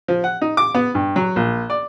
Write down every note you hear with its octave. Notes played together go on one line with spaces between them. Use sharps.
F3
F#5
D#4
D6
B3
G2
F#3
A#1
D5